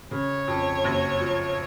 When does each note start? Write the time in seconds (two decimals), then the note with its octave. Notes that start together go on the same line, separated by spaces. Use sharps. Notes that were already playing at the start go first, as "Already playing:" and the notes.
0.11 C#3 C#5
0.48 F2
0.84 F#1
1.20 F3